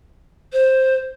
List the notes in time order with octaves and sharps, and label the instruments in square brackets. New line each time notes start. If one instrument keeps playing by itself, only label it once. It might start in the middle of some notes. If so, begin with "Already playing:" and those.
[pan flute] C5